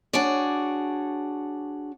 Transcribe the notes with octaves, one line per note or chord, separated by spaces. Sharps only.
D4 F#4 G#4 C#5 D5